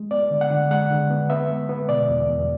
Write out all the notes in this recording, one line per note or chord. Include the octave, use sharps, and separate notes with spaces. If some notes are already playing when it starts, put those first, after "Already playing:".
Already playing: G#3
B3 D5
D3
F#5
D3
G#3 F#5
D3
B3
B3 E5
G#3
B3
B2 D5
E2
E2